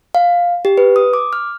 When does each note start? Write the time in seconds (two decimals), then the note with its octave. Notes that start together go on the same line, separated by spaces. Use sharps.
0.15 F5
0.65 G4
0.78 B4
0.96 D#6
1.13 D6
1.33 F6